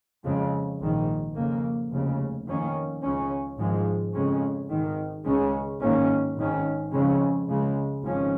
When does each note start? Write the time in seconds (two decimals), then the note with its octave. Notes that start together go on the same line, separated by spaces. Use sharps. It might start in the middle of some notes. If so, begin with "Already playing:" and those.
0.23 F2 C#3 G#3
0.79 A#1 G#2 D#3
1.35 F2 C#3 A#3
1.90 F1 D#2 C#3
2.46 F2 D#3 A#3 C#4
3.02 C#2 C#3 G#3 C#4
3.57 G#1 G#2 F3 G#3
4.13 F2 C#3 G#3 C#4
4.69 G#1 G#2 D#3
5.25 C#2 C#3 G#3 C#4
5.80 G#2 D#3 A#3 C#4
6.36 G#1 G#2 D#3 C#4
6.92 F2 C#3 G#3 C#4
7.48 C#2 C#3 G#3
8.03 G#1 G#2 F3 C#4